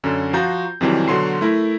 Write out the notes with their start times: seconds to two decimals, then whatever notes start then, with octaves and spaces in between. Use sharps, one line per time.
0.04 F#2 D3 C#4
0.33 F3 F4 F#4 A#5 G6
0.81 F2 C3 D#3 E3 F#3 G3
1.08 B2 D3 F#3 C6 C7
1.41 A3 E4 A#4